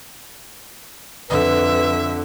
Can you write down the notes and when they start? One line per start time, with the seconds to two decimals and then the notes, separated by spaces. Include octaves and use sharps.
1.30 F2 D3 B4 E5